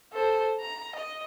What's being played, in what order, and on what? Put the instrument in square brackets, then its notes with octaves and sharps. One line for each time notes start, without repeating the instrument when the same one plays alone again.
[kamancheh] A4 C5
A#5
D#5